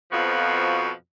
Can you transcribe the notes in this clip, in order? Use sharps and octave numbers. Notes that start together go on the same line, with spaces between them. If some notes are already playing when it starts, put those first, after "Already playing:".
F2 B2 F3 F#4